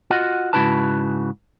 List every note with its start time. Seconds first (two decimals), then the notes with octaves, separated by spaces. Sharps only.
0.10 F4 F#4 D#5 F#5
0.53 G#2 C#3 E4 F#4 B4 A5